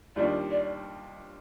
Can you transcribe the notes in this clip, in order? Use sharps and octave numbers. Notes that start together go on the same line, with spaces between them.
D#2 D#3 G3 D4 F4 D5
D5